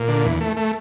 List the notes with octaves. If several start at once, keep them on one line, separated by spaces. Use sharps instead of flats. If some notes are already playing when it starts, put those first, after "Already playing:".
Already playing: A#2
D3
E2
A3
A3